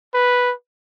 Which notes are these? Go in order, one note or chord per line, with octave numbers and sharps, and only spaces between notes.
B4